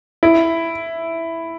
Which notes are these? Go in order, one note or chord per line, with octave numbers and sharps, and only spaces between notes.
E4